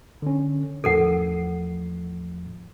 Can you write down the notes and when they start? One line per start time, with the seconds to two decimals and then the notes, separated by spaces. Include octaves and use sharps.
0.22 D3 C#4
0.84 E2 A2 F3 A4 A#4 F#5